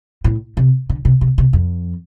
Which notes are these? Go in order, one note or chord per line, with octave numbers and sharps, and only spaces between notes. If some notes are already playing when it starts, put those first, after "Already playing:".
A2
C3
D3
C3
C3
C3
F2